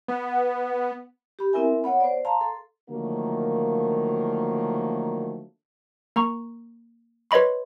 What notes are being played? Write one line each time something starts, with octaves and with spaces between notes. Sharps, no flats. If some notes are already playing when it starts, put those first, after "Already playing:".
B3
G4 B5
B3 C4 E4 A#4 E5 G#5
B3 C#5 F#5 B5
C5 D5
F5 A5 A#5 C6
A4
D3 D#3 F3 F#3 A3 A#3
A#3 A#5 C#6
B4 C#5 D#5 B5 C6